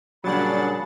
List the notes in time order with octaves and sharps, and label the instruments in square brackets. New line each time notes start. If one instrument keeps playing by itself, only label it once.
[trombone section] A#2 C#3 [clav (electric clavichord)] F#3 G3 [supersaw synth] D4 F#5 A6 [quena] B5